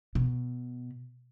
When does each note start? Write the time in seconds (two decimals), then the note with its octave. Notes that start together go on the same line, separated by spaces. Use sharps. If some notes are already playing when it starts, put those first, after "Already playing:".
0.15 B2